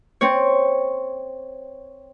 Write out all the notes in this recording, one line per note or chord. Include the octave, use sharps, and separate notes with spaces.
C4 C#5